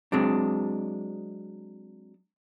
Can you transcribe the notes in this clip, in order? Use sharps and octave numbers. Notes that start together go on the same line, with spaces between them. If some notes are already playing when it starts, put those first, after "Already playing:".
F#3 G#3 C4 D4